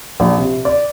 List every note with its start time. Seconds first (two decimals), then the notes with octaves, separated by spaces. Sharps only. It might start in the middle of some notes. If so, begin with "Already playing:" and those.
0.20 A#1
0.38 C3
0.65 D5